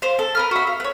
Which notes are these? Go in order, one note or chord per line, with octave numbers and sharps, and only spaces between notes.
C5 F5
A4
A#4 B4 F6
F#4 E5
F5
B4 C#5